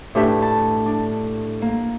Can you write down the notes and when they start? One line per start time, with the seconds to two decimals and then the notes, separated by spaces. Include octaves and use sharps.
0.15 A2 D4 G4 B4 E5
0.42 A5
0.86 D4
1.62 A#3